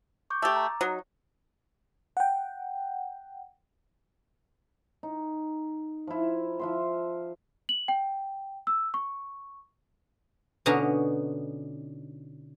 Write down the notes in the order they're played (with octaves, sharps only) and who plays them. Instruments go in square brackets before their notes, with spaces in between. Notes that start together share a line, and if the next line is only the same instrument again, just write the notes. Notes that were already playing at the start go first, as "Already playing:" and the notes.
[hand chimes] C#6 D6 G6
[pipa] A3 G4 [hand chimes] D6 E6 A6
[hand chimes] A#5
[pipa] F#3 D#4
[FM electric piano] F#5 G5
[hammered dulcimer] D#4
F3 E4
F3 E5 C6
[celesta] F#7
G5
E6
C#6
[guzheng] B2 D3 C#4 D#4 A#5